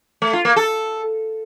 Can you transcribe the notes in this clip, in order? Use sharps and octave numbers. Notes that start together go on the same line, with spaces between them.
A3
F4
A#3
A4